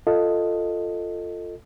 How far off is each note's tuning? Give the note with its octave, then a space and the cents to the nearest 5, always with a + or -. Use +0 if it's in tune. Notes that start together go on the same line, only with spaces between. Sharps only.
F4 +0 A4 +15 D#5 +0